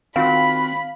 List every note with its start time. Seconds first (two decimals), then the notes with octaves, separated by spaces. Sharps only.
0.16 D#3 C4 F4 F#4 F5 B5